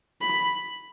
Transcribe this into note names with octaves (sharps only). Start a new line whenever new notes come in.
B5